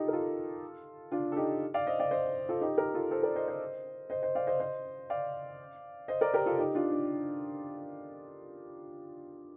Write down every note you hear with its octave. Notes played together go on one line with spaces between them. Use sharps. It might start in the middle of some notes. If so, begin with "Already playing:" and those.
Already playing: D#4 F4 G4 A4
A#4
F4 A4
D4 F4
A4
D#4 G4
D5 F5
C5 D#5
D5 F5
C5 D#5
F4 A4
D#4 G4
G4 A#4
F4 A4
A4 C5
A#4 D5
C5 D#5
C5 D#5
C5 D#5
C5 D#5
D5 F5
C5 D#5
C5 D#5
D5 F5
C5 D#5
A#4 D5
G4 A#4
F4 A4
D#4 G4
D4 F4
D4